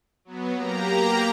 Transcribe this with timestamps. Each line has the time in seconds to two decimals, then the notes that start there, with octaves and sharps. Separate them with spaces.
0.25 F#3 B3
0.56 A#3 G4 A#5